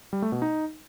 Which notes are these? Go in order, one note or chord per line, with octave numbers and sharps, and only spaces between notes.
G3
A3
B2
D#4